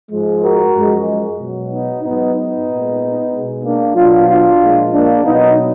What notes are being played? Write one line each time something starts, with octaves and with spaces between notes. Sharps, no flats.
G#2 F3 G#3
F#4 A#4
F#2 F3 G#3
B2 F#3
B3 D#4
G#2 F#3 B3 D#4
B3 D#4
A#2 G#3
B2 G#3
A#3 D4
B2 F#3 D4 F4
D4 F4
A#2 F3 G#3
A#3 D4
B2 F#3 B3 D#4